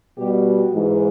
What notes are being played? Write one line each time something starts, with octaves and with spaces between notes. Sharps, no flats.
B2 G3 G4
F#4
G#2 E3 G#3